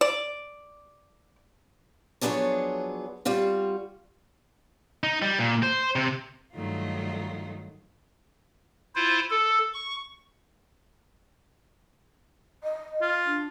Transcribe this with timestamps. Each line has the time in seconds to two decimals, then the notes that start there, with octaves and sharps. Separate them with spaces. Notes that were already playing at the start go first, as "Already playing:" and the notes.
0.01 D5
2.21 F3 F#3 B3 D4 G#4 C#5
3.25 G3 C4 F4 F#4
5.04 D#4
5.22 G3
5.39 A#2
5.63 C5
5.96 C3
6.54 G2 D#3 F#3 A3 D#4 F4
8.96 E4 F4 C5
9.31 A4
9.74 C#6
12.63 D#5
13.02 F4
13.26 D4